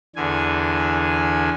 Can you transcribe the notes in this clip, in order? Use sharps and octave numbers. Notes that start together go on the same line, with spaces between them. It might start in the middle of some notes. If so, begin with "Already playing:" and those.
E2 D3 G#5